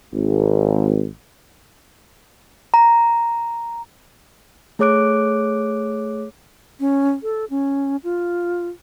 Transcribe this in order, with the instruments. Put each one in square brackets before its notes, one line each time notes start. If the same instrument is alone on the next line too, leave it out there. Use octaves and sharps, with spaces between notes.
[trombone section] G#1
[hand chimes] A#5
A3 G#4 C#5 D6 F#6 D7
[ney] C#4
A4
C#4
F4